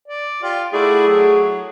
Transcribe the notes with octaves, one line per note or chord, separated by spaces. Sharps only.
D5
F4 G4
A3 E4 F#4 G#4 D5
F#3 F#4